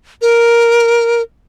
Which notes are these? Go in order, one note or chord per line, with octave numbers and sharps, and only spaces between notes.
A#4